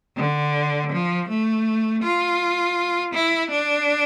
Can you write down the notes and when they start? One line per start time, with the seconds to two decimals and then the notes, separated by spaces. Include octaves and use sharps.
0.17 D3
0.92 F3
1.29 A3
2.03 F4
3.14 E4
3.51 D4